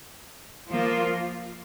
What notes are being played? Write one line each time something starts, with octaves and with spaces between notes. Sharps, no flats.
F3 A#3 F4